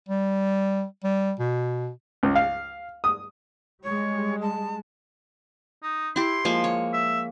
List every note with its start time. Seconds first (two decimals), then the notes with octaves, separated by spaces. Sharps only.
0.09 G3
1.04 G3
1.39 B2
2.23 C#2
2.35 F5
3.04 D#6
3.84 G3 G#3 C#5
4.42 A5
5.82 D#4
6.16 E4 G4 C6
6.45 F3 G#3 A#3
6.64 C#5
6.93 E5